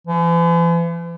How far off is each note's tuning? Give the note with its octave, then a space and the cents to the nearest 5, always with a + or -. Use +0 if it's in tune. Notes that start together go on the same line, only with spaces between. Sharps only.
E3 +45